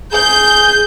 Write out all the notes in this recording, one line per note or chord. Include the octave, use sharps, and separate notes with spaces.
G#4 G6